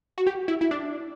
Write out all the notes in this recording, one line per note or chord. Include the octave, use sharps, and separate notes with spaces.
F#4
G4
E4
E4
D4